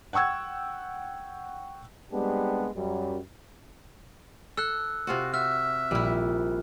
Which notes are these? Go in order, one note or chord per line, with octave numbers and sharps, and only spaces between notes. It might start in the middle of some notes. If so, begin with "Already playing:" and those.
F#5 G5 C#6 E6 G#6
G3 G#3 B3 C4 D4 G4
F#2 F#3 G3
A4 E6 F#6
C3 F4 F#4
F#4 E5 F6
A#1 G3 E4